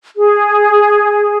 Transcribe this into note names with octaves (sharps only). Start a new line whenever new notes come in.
G#4